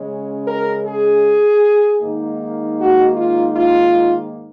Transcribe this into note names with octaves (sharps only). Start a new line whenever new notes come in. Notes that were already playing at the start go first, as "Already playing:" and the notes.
Already playing: C#3 G#3 C#4
A#4
G#4
G#2 D#3 A#3 D#4
F#4
F4
F4